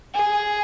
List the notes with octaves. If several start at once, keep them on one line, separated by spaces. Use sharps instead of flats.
G#4